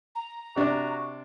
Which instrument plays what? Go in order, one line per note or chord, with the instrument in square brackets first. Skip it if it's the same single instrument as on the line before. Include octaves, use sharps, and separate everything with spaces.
[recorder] A#5
[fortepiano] C3 D4 [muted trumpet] F#4